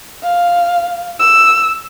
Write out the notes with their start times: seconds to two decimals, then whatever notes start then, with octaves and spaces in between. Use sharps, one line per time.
0.23 F5
1.19 E6